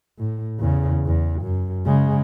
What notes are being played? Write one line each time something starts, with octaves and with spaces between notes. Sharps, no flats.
A2
E2 C#3
E2
F#2
C#3 G#3